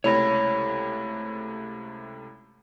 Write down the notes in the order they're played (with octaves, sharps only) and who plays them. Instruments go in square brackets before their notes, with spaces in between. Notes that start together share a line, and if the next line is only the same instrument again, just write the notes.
[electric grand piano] C#2 C3 A3 [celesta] E4 B5 A#6 [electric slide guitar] C#5